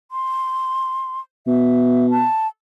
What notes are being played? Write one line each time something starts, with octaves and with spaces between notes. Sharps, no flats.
C6
B2 E5
A5